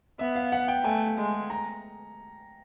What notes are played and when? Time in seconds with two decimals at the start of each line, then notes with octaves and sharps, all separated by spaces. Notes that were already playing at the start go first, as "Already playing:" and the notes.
0.19 B3 E5
0.35 F5
0.52 F#5
0.68 G5
0.84 A3 G#5
1.17 G#3
1.50 A#5